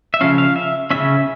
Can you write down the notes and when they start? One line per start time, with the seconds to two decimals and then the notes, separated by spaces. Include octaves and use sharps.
0.14 E5
0.21 C#3 F3 C#4 F5
0.38 F5
0.56 E5
0.90 C#3 F3 C#4 E5